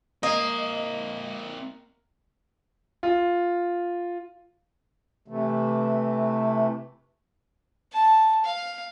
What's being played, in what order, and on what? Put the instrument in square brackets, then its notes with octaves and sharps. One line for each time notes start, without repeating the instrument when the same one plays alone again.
[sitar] A#3 [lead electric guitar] C4 A#4 [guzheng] D#5
[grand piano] F4
[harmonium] C3 E3 A3
[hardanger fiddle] A5
F5